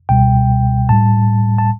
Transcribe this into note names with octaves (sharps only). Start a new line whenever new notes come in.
C#2 B2 G3 G5
A2 G3 A5
A5